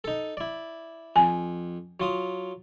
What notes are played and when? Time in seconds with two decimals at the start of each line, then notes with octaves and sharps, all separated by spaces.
0.04 D#4 A4
0.37 E4 D5
1.16 F2 G#5
2.00 F#3 F4 D#6